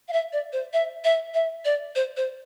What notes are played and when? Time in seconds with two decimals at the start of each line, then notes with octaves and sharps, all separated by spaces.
0.08 F5
0.13 E5
0.33 D5
0.53 C5
0.73 E5
1.04 E5
1.34 E5
1.65 D5
1.95 C5
2.17 C5